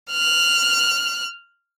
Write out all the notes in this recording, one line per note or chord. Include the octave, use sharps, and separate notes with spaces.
F6 F#6